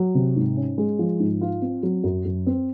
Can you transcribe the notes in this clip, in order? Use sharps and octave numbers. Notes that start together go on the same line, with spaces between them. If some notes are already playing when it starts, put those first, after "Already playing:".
Already playing: F#3
C3
G#2
C#4
G#3
F3
G#2
F4
C4
F#3
F#2
F#2
C4